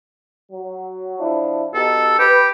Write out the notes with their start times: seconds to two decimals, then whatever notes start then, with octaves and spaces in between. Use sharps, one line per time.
0.51 F#3
1.19 F3 D4 E4
1.74 B2 D#4 G4 A4
2.19 G4 B4